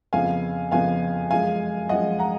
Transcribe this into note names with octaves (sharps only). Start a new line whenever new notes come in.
F2 C#3 F3 B3 F5 G#5
F2 C#3 F3 B3 F5 G#5
F#2 F3 G#3 F5 G#5
F#2 F3 G#3 D#5 F#5
F#5 A#5